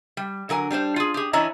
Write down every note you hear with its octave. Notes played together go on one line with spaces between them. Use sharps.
G3
D3 F#3 A#4 G#5
G3 D4 B4 C5
F4 G#4
G4 G#4
E3 D4 E4 C#5 D#5 A#5